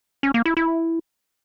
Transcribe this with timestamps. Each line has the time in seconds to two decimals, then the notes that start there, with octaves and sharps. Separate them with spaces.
0.23 C#4
0.34 A#3
0.45 E4
0.57 E4